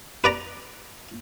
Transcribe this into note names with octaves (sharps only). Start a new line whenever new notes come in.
B4 D5 A#5